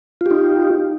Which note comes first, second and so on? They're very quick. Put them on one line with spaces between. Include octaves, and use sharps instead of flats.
F4 G4 D#4